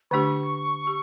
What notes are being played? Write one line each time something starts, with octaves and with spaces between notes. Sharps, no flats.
D3 A3 D4 G4 C#6
G4